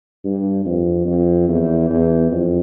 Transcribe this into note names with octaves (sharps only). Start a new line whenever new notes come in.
G2
F2
F2
E2
E2
F2